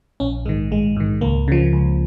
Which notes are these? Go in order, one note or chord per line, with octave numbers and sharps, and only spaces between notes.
A#1 C#4
G#2 D#3 G#3
A#1 G#3
G#2 D#3
C#2 A#3
C#3 F3
C#2